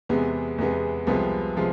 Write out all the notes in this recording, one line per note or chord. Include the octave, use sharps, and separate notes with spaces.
E2 C3 G#3 B3
E2 C3 G#3 B3
C2 C3 F3 G#3 B3
C3 F3 G#3